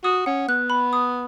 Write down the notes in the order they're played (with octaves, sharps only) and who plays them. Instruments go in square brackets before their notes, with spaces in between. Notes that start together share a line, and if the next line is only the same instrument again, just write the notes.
[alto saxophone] F#4 [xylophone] D#6
[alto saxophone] C#4 [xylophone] F#5
[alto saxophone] B3 [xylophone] F#6
[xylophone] B5
D#6